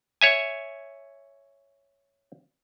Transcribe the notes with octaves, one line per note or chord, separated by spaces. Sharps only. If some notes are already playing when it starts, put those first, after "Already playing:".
C#5 E5 G#5